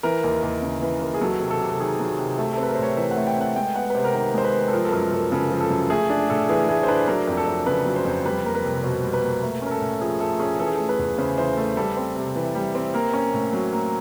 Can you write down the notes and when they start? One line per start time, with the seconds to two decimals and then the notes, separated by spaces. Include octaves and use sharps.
0.03 E3 A#4
0.24 D#2
0.43 D#2
0.62 C#3
0.82 E3
1.02 D#2
1.14 G#4
1.21 F#3 A4
1.40 C3
1.50 A4
1.60 C3
1.69 A4
1.80 D#3 G#4
2.00 F#3
2.19 C3
2.38 A3 A4
2.53 C4 A4
2.63 B4
2.68 A#4
2.75 C5
2.78 A2 C#5
2.97 E3 E5
3.11 F#5
3.17 A3
3.27 G5
3.36 C4 F#5
3.56 G#3 G5
3.75 B3 F#5
3.90 B4
3.95 C3 C5
4.04 A#4
4.15 D#3 B4
4.34 G#3 C5
4.44 B4
4.54 B3
4.68 A4
4.73 F3 A#4
4.84 A4
4.92 F#2 A#4
5.12 F#2 A4
5.32 C#3 A4
5.51 F3
5.61 A4
5.70 F#2
5.90 A3 G#4
6.10 D4 G#4
6.30 A2 A4
6.49 E3 G#4
6.69 A3 G#4
6.83 C5
6.88 D4 B4
7.07 F#3 A#4
7.28 F2
7.37 A4
7.46 F2
7.66 C#3 B4
7.85 F#3
7.96 C5
8.05 F2
8.26 G3 B4
8.44 A#3 A#4
8.55 B4
8.65 C2
8.83 B2 C5
9.03 G3
9.13 B4
9.23 A#3
9.42 A3
9.62 C#4 A#4
9.71 A4
9.81 A2
10.01 F3 G#4
10.20 A3 A4
10.40 C#4 G#4
10.59 E3 A4
10.67 G#4
10.75 A3 A4
10.89 B4
10.99 E2
11.18 C#3 C5
11.38 E3 C5
11.57 A3 A4
11.77 G3 A4
11.97 C4
12.16 C3
12.36 E3
12.55 G3
12.75 C4
12.94 A#3 A#4
13.14 C#4
13.34 A2
13.53 F#3
13.72 A#3